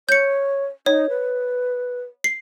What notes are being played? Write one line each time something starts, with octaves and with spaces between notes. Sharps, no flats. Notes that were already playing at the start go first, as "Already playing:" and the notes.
C#5 G6 C#7
D#4 C#5
B4
C7